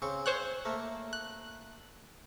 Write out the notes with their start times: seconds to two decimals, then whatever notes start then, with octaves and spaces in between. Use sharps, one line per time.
0.02 C#3 C4 C#6
0.26 C5 C#5 G5 F#6
0.65 A3 A#3
1.13 F#6